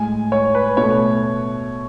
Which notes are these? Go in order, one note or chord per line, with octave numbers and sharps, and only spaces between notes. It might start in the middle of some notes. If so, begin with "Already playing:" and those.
Already playing: A2 G#3 G#5
C#5
B4
B2 A3 C#5